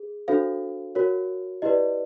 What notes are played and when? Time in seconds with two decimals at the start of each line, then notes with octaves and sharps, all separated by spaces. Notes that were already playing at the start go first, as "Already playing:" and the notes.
Already playing: G#4
0.28 D4 F#4 A4 C5 F5
0.95 F#4 A#4 C#5
1.62 E4 G4 B4 D5 D#5